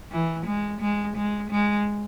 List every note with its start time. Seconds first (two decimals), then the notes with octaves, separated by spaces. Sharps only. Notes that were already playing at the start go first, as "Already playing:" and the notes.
0.12 E3
0.46 G#3
0.80 G#3
1.16 G#3
1.50 G#3